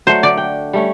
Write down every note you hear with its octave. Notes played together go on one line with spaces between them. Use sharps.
F#3 A3 D4 C5
D3 D5
G5
G3 A3 C#4